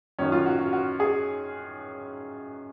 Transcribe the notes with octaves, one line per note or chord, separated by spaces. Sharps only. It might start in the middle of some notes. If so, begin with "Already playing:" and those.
F#2 D#3 F#3 C#4
F4
F#4
F#4
F#4
G#4